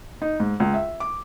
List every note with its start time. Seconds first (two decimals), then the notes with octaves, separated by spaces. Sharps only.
0.22 D#4
0.40 G#2
0.60 C#2
0.74 E5
1.00 D6